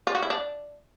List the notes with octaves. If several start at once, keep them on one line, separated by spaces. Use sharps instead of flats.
F4
F#4
E4
D4